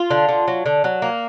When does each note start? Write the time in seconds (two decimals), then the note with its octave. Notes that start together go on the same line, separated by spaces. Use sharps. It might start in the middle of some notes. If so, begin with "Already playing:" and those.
Already playing: F4
0.10 D3
0.29 D3
0.48 F#3
0.66 D3
0.84 F#3
1.02 A#3